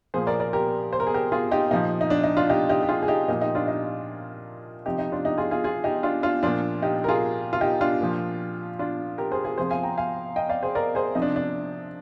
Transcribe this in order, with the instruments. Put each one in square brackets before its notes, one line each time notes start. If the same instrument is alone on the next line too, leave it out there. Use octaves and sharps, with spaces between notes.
[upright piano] A#2 F3 G#4 C5
A#4 D5
A#4 D5
G4 A#4
C5
A#4
G#4
G4 A#4
F4 G#4
D#4 G4
A#2 F3 D#4
D#4
D4
D#4
D4 F4
D#4 G4
D#4 G4
G4
F4 G#4
G#4
D#4 G4
A#2 F3 D#4
D#4 G4
D4 F4
D#4
C3 F3 D#4 G4
D#4
D4 F4
D#4 G4
F4 G#4
F4 G#4
F4 G#4
D#4 G4
D4 F4
D4 F4
A#2 F3 D4 F4
D#4 G4
A#4
F4 G#4
F4
D#4 G4
D4 F4
A#2 F3
D4 F4
G4 A#4
G#4 C5
F4 G#4
C3 F3 G#4 C5
F5 G#5
G5 A#5
F5 G#5
D#5 G5
D5 F5
G#4 C5
A#4 D5
G#4 C5
C3 F3 D#4
D4
D4